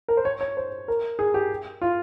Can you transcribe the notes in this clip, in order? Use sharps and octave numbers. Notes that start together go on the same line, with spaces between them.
A#4
C5
C#5
C#5
C5
A#4
G#4
G4
F4